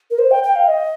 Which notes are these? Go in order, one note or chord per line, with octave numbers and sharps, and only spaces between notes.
A#4
C5
G5
G5
F5
D#5